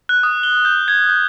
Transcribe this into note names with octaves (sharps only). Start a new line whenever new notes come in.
F#6
D#6
G7
G6
G#6
G6